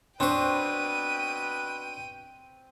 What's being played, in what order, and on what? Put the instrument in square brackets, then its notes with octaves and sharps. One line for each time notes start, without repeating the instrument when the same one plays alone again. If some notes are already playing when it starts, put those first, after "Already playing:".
[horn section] B2 B4 [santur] C4 C#6 [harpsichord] D4 C5 [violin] G5 D#7